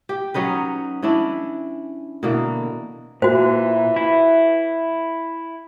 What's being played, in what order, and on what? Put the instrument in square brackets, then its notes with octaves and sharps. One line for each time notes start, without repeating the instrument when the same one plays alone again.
[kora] G4
F#3 C#4 D#4 B4
E3 C#4 D4 E4
B2 D3 E3 A#3
[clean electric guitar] A#2 [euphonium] E3 [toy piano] F#4 C5
[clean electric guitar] E4